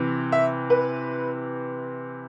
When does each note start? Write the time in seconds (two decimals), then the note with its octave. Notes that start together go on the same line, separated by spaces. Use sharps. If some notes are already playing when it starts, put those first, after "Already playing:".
Already playing: C3 E3
0.32 E5
0.70 B4